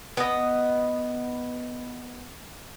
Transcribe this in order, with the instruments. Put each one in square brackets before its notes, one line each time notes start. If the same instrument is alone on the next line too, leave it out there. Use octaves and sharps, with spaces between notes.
[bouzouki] B3 D#5